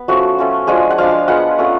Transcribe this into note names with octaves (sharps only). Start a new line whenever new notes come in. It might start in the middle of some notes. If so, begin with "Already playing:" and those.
Already playing: B3
F3 A3 C#4 F#4
A3 C#4 F4
F3 G#3 D4 F4 G#4
F#5
F3 G#3 D4 F5
G#3 B3 F4 F#5
A3 C#4 F4